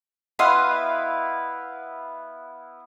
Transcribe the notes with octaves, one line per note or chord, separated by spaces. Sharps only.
B3 E4 B4 D#5 F5 C6